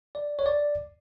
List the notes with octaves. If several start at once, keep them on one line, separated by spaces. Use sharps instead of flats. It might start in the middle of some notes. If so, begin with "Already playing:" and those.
D5
C#5
D5